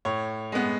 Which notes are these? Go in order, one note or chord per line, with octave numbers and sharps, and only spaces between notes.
A2 C#5
G#3 B3